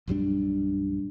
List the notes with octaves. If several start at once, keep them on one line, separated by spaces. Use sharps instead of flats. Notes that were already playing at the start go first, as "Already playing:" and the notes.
A#1 F#2 G3 D4